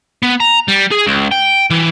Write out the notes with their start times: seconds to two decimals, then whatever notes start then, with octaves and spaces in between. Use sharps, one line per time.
0.23 B3
0.40 A#5
0.68 G3
0.92 G#4
1.07 C#2
1.31 G5
1.70 E3